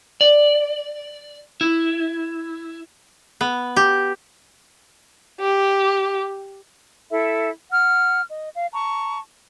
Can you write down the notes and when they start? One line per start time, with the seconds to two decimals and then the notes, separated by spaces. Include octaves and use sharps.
0.21 D5
1.61 E4
3.41 B3
3.76 G4
5.41 G4
7.11 E4 A4 E5
7.71 F#5 F6
8.30 D#5
8.55 F5
8.74 A5 A#5 C#6